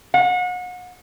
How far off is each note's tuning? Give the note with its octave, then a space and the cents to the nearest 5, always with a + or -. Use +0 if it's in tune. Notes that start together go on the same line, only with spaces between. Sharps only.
F#5 -35